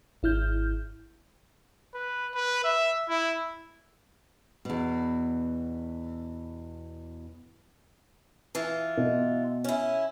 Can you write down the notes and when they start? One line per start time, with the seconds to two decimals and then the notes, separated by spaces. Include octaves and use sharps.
0.23 G#1 E4 F6 G6
1.94 B4
2.35 B4
2.64 E5
3.09 E4
4.65 E2 B2
8.55 E3 F4
8.97 B2
9.64 C#4 E4